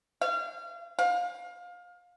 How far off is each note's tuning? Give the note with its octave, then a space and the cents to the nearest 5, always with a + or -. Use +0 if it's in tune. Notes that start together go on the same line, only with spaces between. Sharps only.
F5 -30
F5 +25